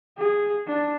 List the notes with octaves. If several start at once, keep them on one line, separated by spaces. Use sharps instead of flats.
G#4
D4